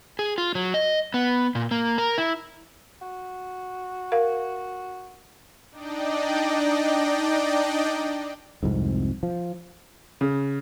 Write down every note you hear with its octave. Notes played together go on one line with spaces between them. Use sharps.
G#4
F4
F#3
D#5
B3
A#2
A#3
A#4
E4
F#4
A#4 F5
D4 D#4 D5 D#5 G5
C2 F2 G#2
F3
C#3